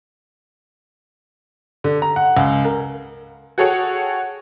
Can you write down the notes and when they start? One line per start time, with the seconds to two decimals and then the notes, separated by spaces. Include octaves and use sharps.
1.84 D3
2.02 A#5
2.16 F#5
2.37 C#2
2.65 A#4
3.58 F#4 G#4 A4 C#5 F#5 G5